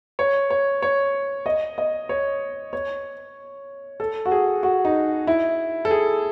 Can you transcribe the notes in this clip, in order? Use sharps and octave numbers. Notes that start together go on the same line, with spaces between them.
C#5
C#5
C#5
D#5
D#5
C#5
C#5
A4
F#4
G#4
F#4
D#4
E4
A4
G#4